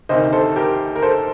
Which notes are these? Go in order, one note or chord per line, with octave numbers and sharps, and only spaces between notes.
D2 C3 D#3 C5 D#5
A4 C5
G4 A#4
A#4
A4 C5